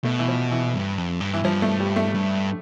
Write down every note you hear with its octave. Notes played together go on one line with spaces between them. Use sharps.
B2 A3
E3
F3
E3
G2
F2
G2
E3
G2 F3
A3
G3
A3
G2